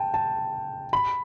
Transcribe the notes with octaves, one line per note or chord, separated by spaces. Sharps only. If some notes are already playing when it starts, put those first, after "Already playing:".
Already playing: G5 A5
A5
B5